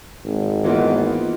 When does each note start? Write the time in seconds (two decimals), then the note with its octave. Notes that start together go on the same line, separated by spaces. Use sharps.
0.25 G#1
0.64 E3 A#3 B3 D#4 F4